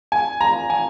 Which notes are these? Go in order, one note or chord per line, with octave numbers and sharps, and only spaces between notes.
G#5
A#5
G#5